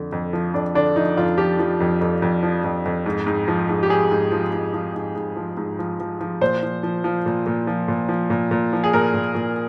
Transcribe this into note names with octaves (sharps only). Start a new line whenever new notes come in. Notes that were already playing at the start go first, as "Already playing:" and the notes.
Already playing: F2 D3
F2
F3
F2 D4
D3 D4
F3 D#4
F2 F4
F3 G4
F3
F2
F2
F2
F3
F2
F2
G#2
G#2
F3
G#2
G4
F3 G#4
G#2
F3
G#2
F3
G#2
G#2
F3
G#2
F3
F3
F3
A#2 C5
F3
F3
F3
A#2
A#2
F3
A#2
F3
A#2
A#2
F3
G#4
A#2 A#4
A#2
A#2